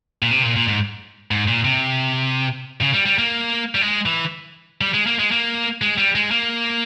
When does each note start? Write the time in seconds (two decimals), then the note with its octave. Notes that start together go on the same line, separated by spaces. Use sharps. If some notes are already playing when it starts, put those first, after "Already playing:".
0.22 A#2
0.31 C3
0.43 A#2
0.56 A#2
0.68 G#2
1.31 G#2
1.48 A#2
1.65 C3
2.81 C#3
2.94 G3
3.06 G3
3.18 A#3
3.75 G3
3.81 G#3
4.06 E3
4.81 G3
4.94 G#3
5.07 A#3
5.19 G#3
5.32 A#3
5.82 G#3
5.98 G3
6.15 G#3
6.31 A#3